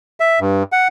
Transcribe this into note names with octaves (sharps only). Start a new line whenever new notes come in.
E5
G2
F#5